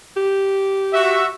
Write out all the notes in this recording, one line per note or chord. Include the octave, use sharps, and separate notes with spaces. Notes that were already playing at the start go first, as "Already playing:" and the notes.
G4
F#4 E5